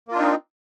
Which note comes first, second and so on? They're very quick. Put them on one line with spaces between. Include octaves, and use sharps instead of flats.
A#3 F4 D4 D#4 C4